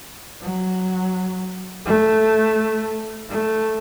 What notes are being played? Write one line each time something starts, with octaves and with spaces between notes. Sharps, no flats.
F#3
A3
A3